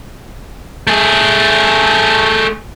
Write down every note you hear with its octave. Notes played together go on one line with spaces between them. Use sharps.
A3 G#4